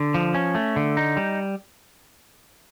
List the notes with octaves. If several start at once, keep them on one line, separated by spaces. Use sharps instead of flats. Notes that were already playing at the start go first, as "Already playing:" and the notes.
Already playing: D3
F3
C#4
A3
D3
D#4
G3